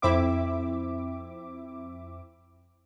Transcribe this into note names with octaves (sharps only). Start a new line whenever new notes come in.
F2 C4 E4 E5 D6